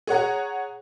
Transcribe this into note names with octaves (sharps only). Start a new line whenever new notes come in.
G#4 C#5 F#5 A#5